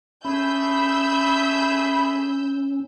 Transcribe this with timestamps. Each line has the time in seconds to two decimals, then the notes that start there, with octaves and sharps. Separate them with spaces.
0.25 A3 C#4 G#4 E5 B5 E6 G6